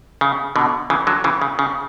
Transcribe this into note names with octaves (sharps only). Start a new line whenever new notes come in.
C#3
B2 D3
C#3 E3
D3 F#3
C#3 E3
C#3
C#3